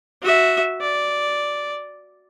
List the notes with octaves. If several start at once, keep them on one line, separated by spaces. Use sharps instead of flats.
F#4 E5
D5